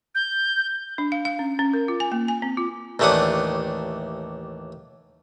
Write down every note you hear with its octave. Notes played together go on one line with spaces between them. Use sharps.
G6
D4
F5
F5
C#4
C#4
A#4
F4
G#5
A#3
G#5
C4
F4
A1 D#2 A3 D4 F#5 D#6